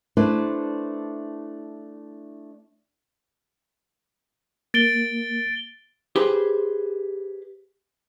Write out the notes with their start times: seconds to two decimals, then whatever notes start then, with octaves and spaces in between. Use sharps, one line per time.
0.17 A3 D4 E4 B4 C5 D5
4.74 A#3 A6 D7 G7
6.16 G4 G#4 B4 C5